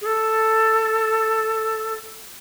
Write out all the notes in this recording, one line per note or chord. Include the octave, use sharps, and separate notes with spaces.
G#4
A4